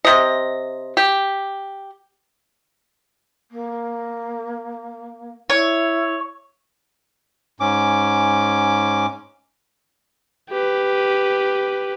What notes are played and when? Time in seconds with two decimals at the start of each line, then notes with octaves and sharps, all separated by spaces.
0.05 C3 D#5
0.97 G4
3.51 A#3
5.50 E4 C#5
7.60 G#2 C#4 D6
10.50 G4 B4